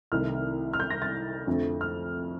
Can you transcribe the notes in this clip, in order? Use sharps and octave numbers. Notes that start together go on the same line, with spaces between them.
C2 C3 D#3 A3 F6
F6
G6
A#6
A6
F2 D3 F3 A3
F6